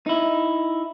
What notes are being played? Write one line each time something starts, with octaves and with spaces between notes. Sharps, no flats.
D#4 E4